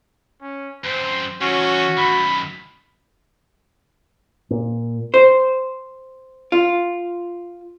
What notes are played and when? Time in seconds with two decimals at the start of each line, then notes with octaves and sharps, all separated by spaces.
0.41 C#4
0.84 F#2 C4 C5
1.41 E2 C#3 C#4 F#4
1.97 F#2 D#3 B5
4.50 A#2
5.14 C5
6.52 F4